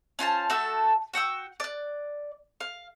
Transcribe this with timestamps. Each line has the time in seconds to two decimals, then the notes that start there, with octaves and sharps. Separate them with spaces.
0.19 C#4 F4 C5 A5
0.50 A3 F#4 A4 E6
1.14 F#4 F#5 G5 E6
1.60 D5 F#6
2.60 F5